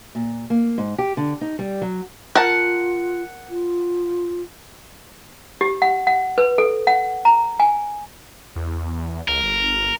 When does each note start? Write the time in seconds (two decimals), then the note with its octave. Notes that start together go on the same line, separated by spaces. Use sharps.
0.15 A#2
0.50 A#3
0.78 G#2
0.98 G4
1.17 D3
1.41 D#4
1.59 G3
1.82 F#3
2.35 F4 A#4 F#5 A5
3.50 F4
5.61 G4
5.82 F#5
6.07 F#5
6.38 B4
6.58 A4
6.87 F#5
7.25 A#5
7.60 G#5
8.56 E2
9.28 C#2 A#4
9.43 G1